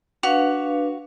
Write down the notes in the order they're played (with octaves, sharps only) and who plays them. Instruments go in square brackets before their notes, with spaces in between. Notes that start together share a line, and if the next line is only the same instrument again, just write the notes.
[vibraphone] D4 B4 F5 [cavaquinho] F#4